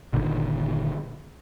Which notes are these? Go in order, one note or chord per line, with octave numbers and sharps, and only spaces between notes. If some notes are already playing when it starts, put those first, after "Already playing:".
G1 A#2 D3 D#3